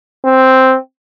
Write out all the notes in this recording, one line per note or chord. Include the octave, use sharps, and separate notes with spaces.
C4